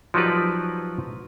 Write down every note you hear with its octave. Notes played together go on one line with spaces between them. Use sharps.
F3 F#3 D#4 G4 B4 D5